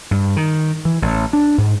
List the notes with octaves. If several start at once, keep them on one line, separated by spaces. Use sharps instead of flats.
G2
D#3
E3
A1
D4
G#2